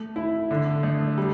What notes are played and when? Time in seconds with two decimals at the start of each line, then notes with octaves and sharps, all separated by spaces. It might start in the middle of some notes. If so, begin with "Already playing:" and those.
Already playing: A3
0.16 E4
0.51 D3
0.83 A3
1.18 G3